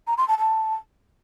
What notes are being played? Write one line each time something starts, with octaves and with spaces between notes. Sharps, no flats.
A#5
C6
A5
A5